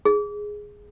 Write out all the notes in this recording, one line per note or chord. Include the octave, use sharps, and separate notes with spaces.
G#4